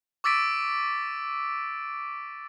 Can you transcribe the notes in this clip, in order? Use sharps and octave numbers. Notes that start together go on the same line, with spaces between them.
C#6 D6 E6 A6 B6 D7